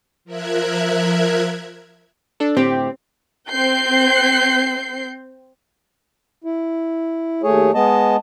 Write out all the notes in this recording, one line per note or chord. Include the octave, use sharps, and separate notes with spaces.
F3 A#4 E5 F#6 G#6
D4 A4
A2 D3 C4 G4
C4 G6 C7
E4
D#2 A3 G#4 C#5
G#3 B3 D#5 A5